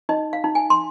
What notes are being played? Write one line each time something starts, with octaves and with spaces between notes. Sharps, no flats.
D#4 D#5
F5
D#4
G#5
C6